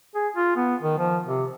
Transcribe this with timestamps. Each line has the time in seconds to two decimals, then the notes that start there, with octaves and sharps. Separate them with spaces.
0.15 G#4
0.36 F4
0.56 B3
0.82 D#3
0.98 F3
1.26 C3